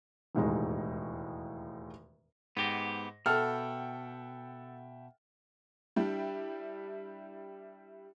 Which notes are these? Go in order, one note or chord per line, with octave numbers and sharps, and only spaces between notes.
E1 D#2 A2 G#3 D#4
G#2 B3 G4 A#6
B2 A4 E5 F#5 G5 F6
G3 D4 E4 G4